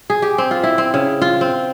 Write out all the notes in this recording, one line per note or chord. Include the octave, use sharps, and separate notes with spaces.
G#4
G4
C4
F4
E4
C4
C#3
F4
C4